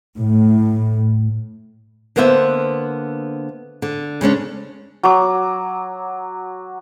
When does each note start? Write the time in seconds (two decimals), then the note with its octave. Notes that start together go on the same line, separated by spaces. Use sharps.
0.18 A2
2.16 D3 A#3 B3 C5 E5
3.82 D3
4.21 C#3 G#3 C#4 D4
5.03 F#3 D6